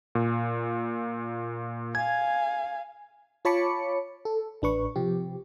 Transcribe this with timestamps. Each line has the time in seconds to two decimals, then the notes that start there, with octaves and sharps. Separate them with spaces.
0.15 A#2
1.95 F5 G#5 G#6
3.45 F4 C#5 A5 B5 D6 C#7
4.25 A4
4.62 A1 D4 B4 C#6
4.96 C3 F3 G4